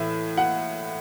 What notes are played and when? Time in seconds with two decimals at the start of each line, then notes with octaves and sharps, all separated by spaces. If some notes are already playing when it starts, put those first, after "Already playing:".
Already playing: A2 E3 E5
0.37 F#5